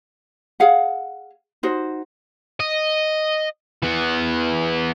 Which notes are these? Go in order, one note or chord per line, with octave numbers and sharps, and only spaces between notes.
G#4 F5 F#5
D#4 F#4 C5
D#5
E3 B3